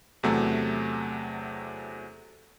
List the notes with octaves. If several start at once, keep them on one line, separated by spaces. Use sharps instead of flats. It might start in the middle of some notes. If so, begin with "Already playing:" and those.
E2 C3 F#3 A3